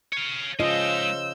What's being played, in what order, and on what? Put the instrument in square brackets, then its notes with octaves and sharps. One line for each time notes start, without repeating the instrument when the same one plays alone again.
[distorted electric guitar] C#5 F5
[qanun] C#3 F3 F4 [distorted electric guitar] G#3 D#4 [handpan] D#5 [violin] E6 G6